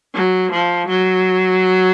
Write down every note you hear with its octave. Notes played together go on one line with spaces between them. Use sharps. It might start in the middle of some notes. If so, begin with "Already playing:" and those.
F#3
F3
F#3